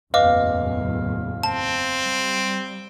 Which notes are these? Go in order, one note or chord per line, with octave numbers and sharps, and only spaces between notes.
F#1 E2 A2 B4 D#5 F5 D6
C4 A5
G3